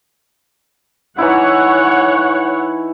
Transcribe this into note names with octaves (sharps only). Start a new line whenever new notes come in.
E3 D#4 E4 C#5 F#5